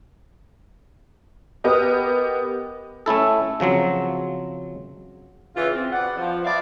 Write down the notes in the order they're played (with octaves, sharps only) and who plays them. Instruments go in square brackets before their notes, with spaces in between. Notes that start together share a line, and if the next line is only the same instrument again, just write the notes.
[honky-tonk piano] B3 G4 D#5 [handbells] A#4 B4 D#6
[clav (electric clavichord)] A3 C#4 E4 A4
C#3 F3 F#3 C4
[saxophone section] C#3 E3 F4
C4
B2 D5 F#5
F3
B3 D5 E5 F5